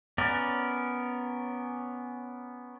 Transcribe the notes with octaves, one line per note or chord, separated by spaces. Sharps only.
B3 C#4 A#4 D5